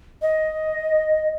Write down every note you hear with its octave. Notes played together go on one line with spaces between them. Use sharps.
D#5